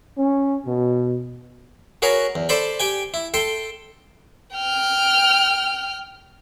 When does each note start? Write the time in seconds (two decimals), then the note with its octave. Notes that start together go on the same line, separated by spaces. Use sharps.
0.18 C#4
0.65 B2
2.02 F#4 G#4 A#4 B4 C#5
2.35 E2
2.49 A4 C5 D5 B5
2.80 G4 G5 G#5
3.14 E4
3.34 A4 G5 C6
4.56 G5 F6